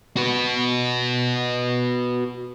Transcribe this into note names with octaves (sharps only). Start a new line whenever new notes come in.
F#4 B4